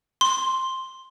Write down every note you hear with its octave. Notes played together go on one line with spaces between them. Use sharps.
C6